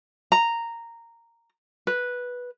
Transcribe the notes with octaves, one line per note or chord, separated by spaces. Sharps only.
A#5
B4